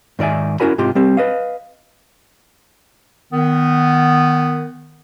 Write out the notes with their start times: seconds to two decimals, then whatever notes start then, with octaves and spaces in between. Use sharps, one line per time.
0.19 G#2 D#3 D5 E5 G#5
0.60 C#4 E4 F#4 A#4 G#5 B5
0.78 G#2 C3 F4 G4 C6
0.95 G3 C4
1.17 B4 D#5 F5
3.33 D#3 B3